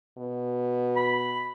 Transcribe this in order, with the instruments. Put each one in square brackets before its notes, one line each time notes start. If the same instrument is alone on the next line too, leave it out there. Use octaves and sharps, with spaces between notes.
[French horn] B2
[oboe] B5